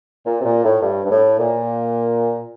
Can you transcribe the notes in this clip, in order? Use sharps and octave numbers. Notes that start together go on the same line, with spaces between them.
A#2
C3
A#2
A2
G2
G2
A2
A#2